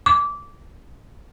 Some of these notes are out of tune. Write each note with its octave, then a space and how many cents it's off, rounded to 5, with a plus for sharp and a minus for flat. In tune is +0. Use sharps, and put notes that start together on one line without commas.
D6 -20